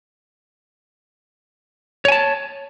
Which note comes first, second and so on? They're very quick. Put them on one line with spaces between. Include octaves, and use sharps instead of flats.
C#5 G#5 A5